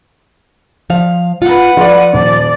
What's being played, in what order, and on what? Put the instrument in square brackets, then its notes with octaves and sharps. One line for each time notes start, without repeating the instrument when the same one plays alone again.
[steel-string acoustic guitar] F3 F5
[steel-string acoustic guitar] F4 [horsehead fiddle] B4 F#5
[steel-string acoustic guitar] F3 [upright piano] F4 D5
[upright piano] D#1 [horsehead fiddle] D5